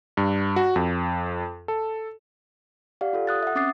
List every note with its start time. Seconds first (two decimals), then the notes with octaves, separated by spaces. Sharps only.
0.17 G2
0.56 F#4
0.76 F2
1.68 A4
3.01 G4 D5 F5 F#5
3.13 F4 A4
3.27 D#6 F#6 A6
3.43 E5 F#5
3.55 C4 C#4 D6 D#6 A6 C7